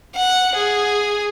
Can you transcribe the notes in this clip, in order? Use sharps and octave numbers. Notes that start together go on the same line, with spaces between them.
F#5
G#4